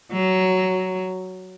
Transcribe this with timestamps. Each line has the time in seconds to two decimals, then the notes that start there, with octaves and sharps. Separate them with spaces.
0.13 F#3